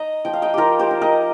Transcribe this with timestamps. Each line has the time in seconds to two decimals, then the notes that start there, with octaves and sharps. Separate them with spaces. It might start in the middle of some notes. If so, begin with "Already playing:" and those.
Already playing: D#4 D#5 A#5
0.25 F3 G5
0.33 F5
0.42 D#5 G5
0.54 F3 F4 G4 A#4
0.79 G4 C5
0.91 D#4
1.01 A#4 D#5